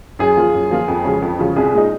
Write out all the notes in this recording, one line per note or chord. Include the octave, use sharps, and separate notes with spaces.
F#2 G#4
F3 A#3 F4
F#2
F3 A#3 F4
F2
C#3 F3 G#3 C#4
F2
C#3 F3 G#3 C#4
C2 G#4
A#2 G#3 D#4